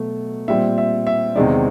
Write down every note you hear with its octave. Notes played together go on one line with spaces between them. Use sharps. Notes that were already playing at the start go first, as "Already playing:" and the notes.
Already playing: B2 F#3 A3
A#2 G3 C4 E5
E5
E5
E2 C3 D#3 G#3 C4 D5